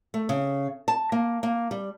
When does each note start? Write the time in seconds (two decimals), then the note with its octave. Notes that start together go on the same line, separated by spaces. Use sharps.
0.14 A3
0.29 C#3
0.88 A5
1.12 A#3
1.43 A#3
1.71 G3